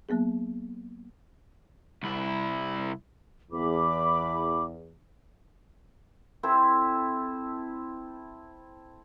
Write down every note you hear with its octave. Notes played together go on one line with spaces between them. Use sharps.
F#3 A#3 B3 G#4
C2 E4
E2 B5 D6
C4 E4 A4 C5